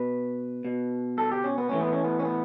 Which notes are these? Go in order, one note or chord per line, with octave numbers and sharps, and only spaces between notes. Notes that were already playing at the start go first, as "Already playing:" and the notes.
Already playing: B2 B4
B2
A4
G4
C#4
B3
A2 E3 C#4
B3
C#4
B3
C#4
B3